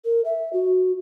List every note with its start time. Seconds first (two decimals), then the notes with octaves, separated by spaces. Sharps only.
0.05 A#4
0.25 E5
0.53 F#4